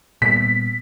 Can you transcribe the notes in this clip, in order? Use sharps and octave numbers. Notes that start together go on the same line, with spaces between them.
A#2 G3 B3 B6